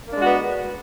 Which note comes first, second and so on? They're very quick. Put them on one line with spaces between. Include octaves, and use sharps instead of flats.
A#3 D4 G#3 F#4 B3